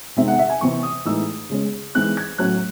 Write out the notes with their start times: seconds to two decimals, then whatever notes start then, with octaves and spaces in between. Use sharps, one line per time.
0.16 C3 D#3 G#3 C4 E5
0.28 F#5
0.39 E5
0.50 G#5
0.61 C3 E3 C4 C#6
0.83 D#6
1.05 A2 E3 G#3 D#4 E6
1.50 C#3 G#3 C#4
1.95 E3 G#3 C4 D#4 F#6
2.17 G#6
2.38 A2 F#3 C#4 F#6